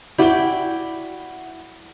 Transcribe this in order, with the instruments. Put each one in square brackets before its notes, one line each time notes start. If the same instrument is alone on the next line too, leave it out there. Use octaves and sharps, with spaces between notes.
[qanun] E4 D5 G5 [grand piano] F#4 G7